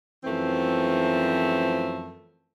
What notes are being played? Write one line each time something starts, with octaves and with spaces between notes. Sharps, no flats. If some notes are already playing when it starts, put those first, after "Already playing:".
F#2 E3 F3 A3 C4